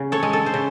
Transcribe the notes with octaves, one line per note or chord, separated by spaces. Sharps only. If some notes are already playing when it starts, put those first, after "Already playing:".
Already playing: C#3
A4 C#5
G#3
A4
C5
C#3